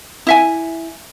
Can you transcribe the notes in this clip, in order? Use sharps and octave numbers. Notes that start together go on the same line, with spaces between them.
E4 E5 G#5